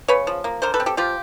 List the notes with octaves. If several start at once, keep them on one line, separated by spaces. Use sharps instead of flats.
C#3 B4 C#5
F3
A#3
D3 A#4 C5
A4 B4
C4
G4 A4
F3 F4 G4